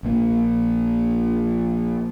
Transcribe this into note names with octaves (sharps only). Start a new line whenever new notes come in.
A#1 A#3